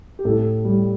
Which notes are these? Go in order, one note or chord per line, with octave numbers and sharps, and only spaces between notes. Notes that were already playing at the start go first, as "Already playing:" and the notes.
G4
A2 A4
G3